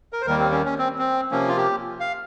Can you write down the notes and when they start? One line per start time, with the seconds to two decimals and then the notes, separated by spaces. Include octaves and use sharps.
0.13 A#4
0.21 C5
0.26 D#2 D#3 G3 A#3 A#4
0.39 C4
0.52 C#4
0.65 C#4
0.78 C4
0.99 C4
1.31 C3 F3 A#3 C#4
1.49 F4
1.57 G4
2.00 F5